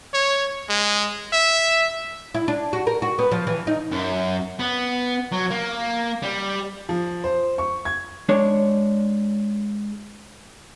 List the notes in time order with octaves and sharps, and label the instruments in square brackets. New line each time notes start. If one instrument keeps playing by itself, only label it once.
[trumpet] C#5
G#3
E5
[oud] E4
D4
F#4
A#4
F#4
B3
F3
E3
D#4
[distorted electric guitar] F#2
B3
F#3
A#3
G3
[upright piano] F3
C5
C#6
G#6
[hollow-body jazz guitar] G#3 D4 C#5